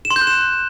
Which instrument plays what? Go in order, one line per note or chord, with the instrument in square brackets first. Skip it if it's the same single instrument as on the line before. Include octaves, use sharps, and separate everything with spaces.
[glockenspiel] E7
C6
G6
F#6
E7